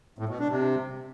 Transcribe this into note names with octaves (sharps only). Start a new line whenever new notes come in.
A2
B2
D4
C3